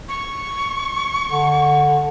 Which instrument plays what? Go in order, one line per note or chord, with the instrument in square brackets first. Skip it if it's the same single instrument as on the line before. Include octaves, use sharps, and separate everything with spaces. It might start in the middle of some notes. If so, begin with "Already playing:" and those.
[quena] C#6
[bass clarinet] D3